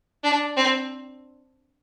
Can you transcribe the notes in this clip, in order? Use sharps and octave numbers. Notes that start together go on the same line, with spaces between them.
D4
C4